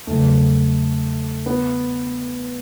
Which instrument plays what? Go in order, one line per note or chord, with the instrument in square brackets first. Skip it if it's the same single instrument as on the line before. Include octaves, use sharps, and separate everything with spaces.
[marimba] E2 C#3 F#3 [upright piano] A3
[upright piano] B3